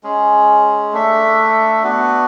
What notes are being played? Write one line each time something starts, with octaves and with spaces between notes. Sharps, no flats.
G#3 C#4 G#4
A3 D4 A4 E5
B3 D4 F#4 B4